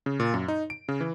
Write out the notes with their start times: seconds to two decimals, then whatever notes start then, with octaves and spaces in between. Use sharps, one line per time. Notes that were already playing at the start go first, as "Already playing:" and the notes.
0.06 C#3
0.20 A#2
0.34 F#2
0.48 D#4
0.70 D7
0.88 C#3
1.01 E3